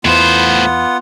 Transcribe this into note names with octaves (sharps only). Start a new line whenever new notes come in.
E2 A2 E3 B3 F4 C5 F#5